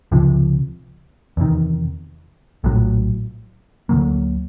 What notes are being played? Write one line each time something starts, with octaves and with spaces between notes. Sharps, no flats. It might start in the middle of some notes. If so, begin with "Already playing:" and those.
C#2 C3 F3
E2 C3 D#3
A#1 A2 F#3
D2 D3 F#3 A#3